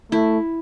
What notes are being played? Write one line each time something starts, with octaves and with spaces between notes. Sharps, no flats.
A3 E4